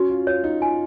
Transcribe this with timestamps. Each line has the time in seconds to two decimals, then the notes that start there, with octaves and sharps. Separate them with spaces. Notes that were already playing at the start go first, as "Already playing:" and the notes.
Already playing: C#4 F#4
0.10 F4
0.27 F4 C#5
0.44 D#4
0.61 F4 G#5